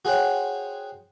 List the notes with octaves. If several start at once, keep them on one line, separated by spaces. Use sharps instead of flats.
F#4 G#4 C5 C#5 F#5 G5